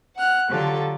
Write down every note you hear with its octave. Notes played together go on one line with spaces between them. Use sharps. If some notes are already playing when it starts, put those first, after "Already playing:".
F#5 F6 F#6
D3 F#3 F4 G4 A4